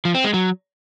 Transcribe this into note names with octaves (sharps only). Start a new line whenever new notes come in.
F3
C4
G#3
F#3